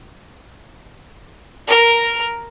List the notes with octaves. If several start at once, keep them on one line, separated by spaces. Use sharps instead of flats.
A#4